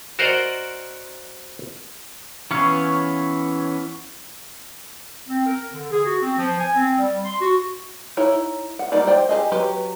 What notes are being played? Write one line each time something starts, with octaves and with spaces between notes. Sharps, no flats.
F#4 A#4 C5 D5 D#5 F#5
E3 B3 C#4 C#5 F5
C4
A#4
D3
G#4
F#4
C4
F3
G#5
C4
G3
C6
F#4
D#4 E4 C#5
F#5
G3 A#3 D#4 D5
C5 D5 G5
G4 G#4 D#5
F#3 G4 B4 G5